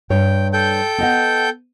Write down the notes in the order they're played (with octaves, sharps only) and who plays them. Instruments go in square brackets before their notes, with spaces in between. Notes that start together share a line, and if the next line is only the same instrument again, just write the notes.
[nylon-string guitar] G2 C#5 [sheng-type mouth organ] G5
[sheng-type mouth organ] A4 G5 G6
[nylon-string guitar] B3 D#5 F#5